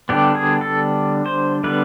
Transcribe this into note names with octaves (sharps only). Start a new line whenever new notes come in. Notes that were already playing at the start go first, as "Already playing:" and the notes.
D3 G3 B3 D4 G4
G#4
A4
C5
D3 G3 B3 B4